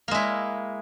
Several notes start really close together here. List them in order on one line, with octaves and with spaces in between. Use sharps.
A#3 G#3 E4